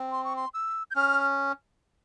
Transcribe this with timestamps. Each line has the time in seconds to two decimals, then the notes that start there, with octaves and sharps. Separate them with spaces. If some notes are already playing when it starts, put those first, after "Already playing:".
Already playing: C4
0.12 C6
0.24 C#6
0.36 C6
0.54 E6
0.91 G6
0.95 C#4 F6